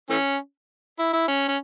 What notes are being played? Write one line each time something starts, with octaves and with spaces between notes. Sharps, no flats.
E3 A3 C#4
E4
E4
C#4
C#4